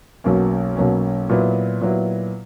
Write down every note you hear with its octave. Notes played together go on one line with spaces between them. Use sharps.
B1 B2 F#3 A#3 C#4
B1 B2 F#3 A#3 C#4
A#2 F#3 B3 E4
A#2 F#3 B3 E4